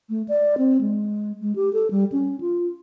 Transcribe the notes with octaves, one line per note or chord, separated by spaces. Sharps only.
A3
D5
C4
G#3
G#3
G4
A4
G3
C#4
F4